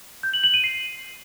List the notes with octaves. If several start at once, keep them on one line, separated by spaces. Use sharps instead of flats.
G6
F#7
F#7
D#7
C7